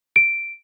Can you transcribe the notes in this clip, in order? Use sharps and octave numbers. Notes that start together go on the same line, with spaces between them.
D7